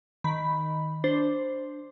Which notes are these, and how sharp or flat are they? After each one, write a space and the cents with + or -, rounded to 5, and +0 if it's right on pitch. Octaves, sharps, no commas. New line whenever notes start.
D#3 +0 B5 +0
D4 +0 C5 +0